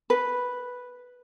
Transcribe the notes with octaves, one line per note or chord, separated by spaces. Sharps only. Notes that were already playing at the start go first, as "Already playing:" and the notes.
B4